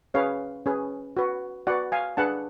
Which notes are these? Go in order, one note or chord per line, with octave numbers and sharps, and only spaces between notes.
C#4 G#4 B4 C#5 F5
C#4 G#4 B4
F#4 B4
F#4 B4 D5 F#5
F5 G#5
D4 G#4 B4 F#5 A5